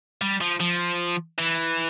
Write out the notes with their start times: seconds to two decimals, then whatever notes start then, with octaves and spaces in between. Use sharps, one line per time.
0.22 G3
0.41 F3
0.60 F3
1.39 E3